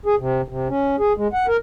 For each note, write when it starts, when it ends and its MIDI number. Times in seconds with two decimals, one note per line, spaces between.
0.06 0.15 68
0.19 0.42 48
0.48 0.68 48
0.69 0.96 61
0.99 1.13 68
1.17 1.28 56
1.33 1.46 78
1.48 1.57 70